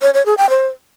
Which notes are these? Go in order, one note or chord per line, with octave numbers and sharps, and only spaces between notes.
C#5
C#5
G#4
G5
C5